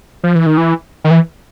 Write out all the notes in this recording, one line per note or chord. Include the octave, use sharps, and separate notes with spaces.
F3
E3
D#3
E3
D#3
E3